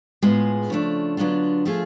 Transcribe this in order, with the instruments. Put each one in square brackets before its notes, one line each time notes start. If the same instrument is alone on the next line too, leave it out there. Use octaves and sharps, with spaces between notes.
[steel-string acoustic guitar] A2 G#3 B3 F4 G#4
C#3 F3 A3 D4
D3 F#3 B3 D4 F4
F3 A3 F4 G#4